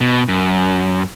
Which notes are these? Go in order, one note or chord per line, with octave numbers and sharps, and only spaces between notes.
B2
F#2